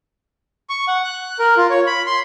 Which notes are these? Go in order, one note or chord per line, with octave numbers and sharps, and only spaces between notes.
C#6
F#5
F#6
A#4
F4
C#5
B5
C6